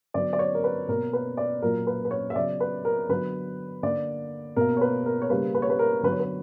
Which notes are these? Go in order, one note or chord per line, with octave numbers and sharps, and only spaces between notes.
D3 F#3 B3 D5
D5
C#5
A#4
B4
B2 A#3 A#4
B4
D5
A#2 F#3 A#3 A#4
B4
B4
C#5
E5
C#3 F#3 B3 D5
B4
A#4
D3 F#3 B3 B4
D3 A#3 D5
B2 A#3 A#4
C#5
B4
A#4
C#5
C#3 G3 A#3 B4
B4
C#5
B4
A#4
D3 F#3 B3 B4
C#5
B4